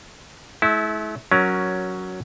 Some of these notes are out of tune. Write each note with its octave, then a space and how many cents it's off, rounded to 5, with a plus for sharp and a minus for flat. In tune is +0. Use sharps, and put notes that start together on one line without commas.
A3 -45 E4 -20
F#3 +0 C#4 +10 A#4 +15